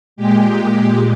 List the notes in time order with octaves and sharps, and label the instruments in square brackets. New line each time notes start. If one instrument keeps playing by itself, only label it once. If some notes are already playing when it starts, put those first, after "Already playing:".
[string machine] A#2 G#3 G4